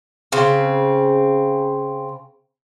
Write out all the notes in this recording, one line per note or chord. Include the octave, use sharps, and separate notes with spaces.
C#3 C4